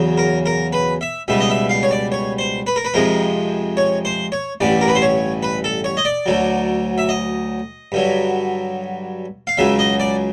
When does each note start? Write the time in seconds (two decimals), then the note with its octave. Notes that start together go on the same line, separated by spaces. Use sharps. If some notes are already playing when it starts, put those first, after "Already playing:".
Already playing: E2 C#3 F#3
0.17 A#4
0.46 A#4
0.73 B4
1.01 E5
1.28 C#2 B2 G3 E5
1.40 D#5
1.50 E5
1.69 F5
1.83 C#5
1.91 D5
2.12 C#5
2.39 C5
2.67 B4
2.76 A#4
2.85 B4
2.94 F2 C3 F3 G#3 A#4
3.77 C#5
4.05 C5
4.32 C#5
4.61 A1 G2 D3 D5
4.81 A#4
4.88 B4
4.95 C5
5.02 C#5
5.43 B4
5.64 A4
5.84 C#5
5.97 D#5
6.05 D5
6.26 D2 D3 F#3
6.98 E5
7.09 D#5
7.92 G2 D3 F#3
9.47 F5
9.57 C#2 C#3 F#3 E5
9.79 D#5
10.00 D5